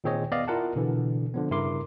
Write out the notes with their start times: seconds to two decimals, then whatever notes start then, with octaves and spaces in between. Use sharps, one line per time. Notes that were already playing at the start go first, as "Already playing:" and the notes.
0.04 A#2 D#3 C4 G#4 C#5 D#5
0.32 B3 D5 D#5 F5
0.48 E4 F4 A#4 F#5 A5
0.76 B2 D3 E3
1.34 D3 F3 B3
1.51 G2 C#3 E4 A#4 C6 D6